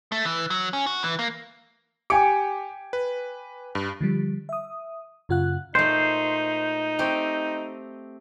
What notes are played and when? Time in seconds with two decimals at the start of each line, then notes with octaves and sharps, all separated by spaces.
0.12 A3
0.25 E3
0.50 F#3
0.73 C#4
0.86 F#4
1.04 E3
1.19 A#3
2.10 G4 G5 G#5 D6 C#7 D7
2.93 B4
3.75 G2
4.01 D3 F3 G3
4.49 E5 D#6
5.29 F#2 C#3 F4 F#5 F#6
5.75 A#2 A3 D#4 C5
6.99 A3 C4 G4